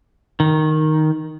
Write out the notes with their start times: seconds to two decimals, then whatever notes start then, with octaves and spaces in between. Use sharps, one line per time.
0.40 D#3